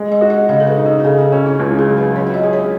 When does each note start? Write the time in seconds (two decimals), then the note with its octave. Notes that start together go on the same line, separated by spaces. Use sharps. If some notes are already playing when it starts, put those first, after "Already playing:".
Already playing: G#3
0.12 D#5
0.21 F#4
0.30 D#5
0.49 C#3 D#5
0.60 A4
0.67 B4
0.77 D#4
0.86 F#4
1.00 A4
1.04 C#3 G#4
1.19 F#4
1.32 C#4 F#4
1.46 E4
1.60 C#2
1.79 G#4
1.89 F#3
1.97 B4
2.16 F#3 C#5
2.27 E5
2.34 D#5
2.43 G#4
2.53 C#5